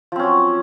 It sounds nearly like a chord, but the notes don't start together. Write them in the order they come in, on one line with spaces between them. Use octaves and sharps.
F3 C4 C#4 F#3